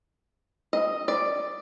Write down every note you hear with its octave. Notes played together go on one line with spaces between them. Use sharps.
D#5
D5